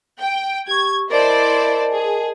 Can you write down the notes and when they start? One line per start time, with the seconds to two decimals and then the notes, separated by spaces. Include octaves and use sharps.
0.19 G5
0.67 G4 C#6 G#6
1.10 E4 A#4 C5 D5 D#5 A5
1.93 G#4